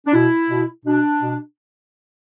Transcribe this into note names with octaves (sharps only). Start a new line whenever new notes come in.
D4
B2 E4
B2
B2 D4
B2